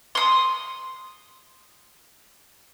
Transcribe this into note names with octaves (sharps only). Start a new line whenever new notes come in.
C6 D#6